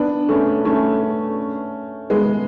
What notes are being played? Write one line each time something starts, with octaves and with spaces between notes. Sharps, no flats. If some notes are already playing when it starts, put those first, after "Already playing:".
Already playing: B3 D4
A3 C#4
A3 C#4
G#3 B3